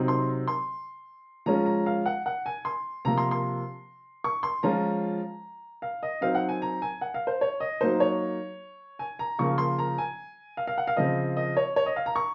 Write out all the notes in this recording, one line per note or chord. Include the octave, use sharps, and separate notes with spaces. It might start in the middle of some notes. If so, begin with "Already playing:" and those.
Already playing: C3 F#3 C4 D#4
C6
C6
F3 G#3 C#4 F4 A#5
A#5
F5
F#5
F#5
G#5
C6
C3 F3 A#3 A#5
C6
C6
C#6
C6
F3 G#3 C#4 F4 A#5
F5
D#5
F#3 C4 D#4 F5
F#5
G#5
A#5
G#5
F#5
F5
C5
C#5
D#5
F#3 A#3 D#4 C5
C#5
G#5
A#5
C#3 F3 A#3 C#6
C6
A#5
G#5
F5
F5
F#5
F5
C#3 F3 C4 D#5
D#5
C#5
C#5
D#5
F5
A#5
C#6